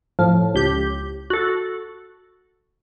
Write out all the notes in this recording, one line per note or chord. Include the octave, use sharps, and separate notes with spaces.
A2 F3
C#2 G4 G6
F#4 A4